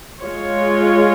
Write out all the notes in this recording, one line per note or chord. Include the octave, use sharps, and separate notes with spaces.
G#3 F4 C#5